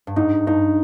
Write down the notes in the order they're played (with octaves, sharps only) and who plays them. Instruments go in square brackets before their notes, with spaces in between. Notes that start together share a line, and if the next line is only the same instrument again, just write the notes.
[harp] G2
[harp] G#2 [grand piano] D#4
[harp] G2 [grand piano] D#4